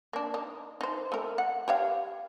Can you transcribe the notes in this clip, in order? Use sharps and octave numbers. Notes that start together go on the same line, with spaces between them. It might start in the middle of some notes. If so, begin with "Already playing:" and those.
A#3 D4
D#4
D#4 C5
A3 A#4
F#5
G4 C#5 F5